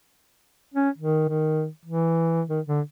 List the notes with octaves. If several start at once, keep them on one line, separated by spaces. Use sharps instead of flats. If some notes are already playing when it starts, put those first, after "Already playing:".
C#4
D#3
D#3
E3
D#3
D3